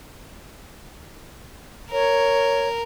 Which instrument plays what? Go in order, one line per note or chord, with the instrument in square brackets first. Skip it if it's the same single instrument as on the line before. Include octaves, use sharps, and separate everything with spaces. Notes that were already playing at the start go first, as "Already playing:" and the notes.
[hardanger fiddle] A#4 [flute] C#5